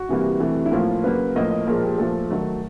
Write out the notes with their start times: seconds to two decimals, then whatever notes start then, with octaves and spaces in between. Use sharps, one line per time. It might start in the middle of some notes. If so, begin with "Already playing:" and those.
Already playing: F#4
0.09 C3 E3 G3 A#3
0.40 C3 E3 A3
0.66 E4
0.71 A2 F3 A#3 F4
1.03 C#3 F#3 A#3 B4
1.35 A2 F3 A#3 D#5
1.51 D#5
1.67 A#2 F3 G#3 A#4
1.83 G4
1.98 A#2 F3 A3 A4
2.30 D#3 F#3 A3